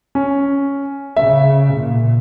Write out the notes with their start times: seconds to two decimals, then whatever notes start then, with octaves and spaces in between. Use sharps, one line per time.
0.15 C#4
1.17 C#3 E5
1.76 A#2